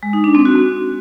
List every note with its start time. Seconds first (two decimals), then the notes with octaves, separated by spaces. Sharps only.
0.03 G#3
0.13 D#4
0.24 D4
0.35 C4
0.45 F#4